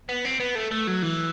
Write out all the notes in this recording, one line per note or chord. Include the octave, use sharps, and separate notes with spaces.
B3
C4
B3
A3
A3
F#3
E3